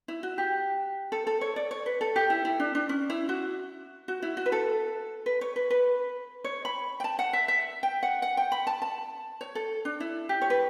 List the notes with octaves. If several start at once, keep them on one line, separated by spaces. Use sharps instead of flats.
E4
F#4
G4
A4
A4
C#5
D5
C#5
B4
A4
G4
E4
E4
D4
D4
C#4
E4
F#4
F#4
E4
F#4
B4
A4
B4
C#5
B4
B4
C#5
B5
G5
A5
F#5
E5
E5
G5
F#5
F#5
G5
B5
A5
A5
C#5
A4
D4
E4
G4
C#5
B4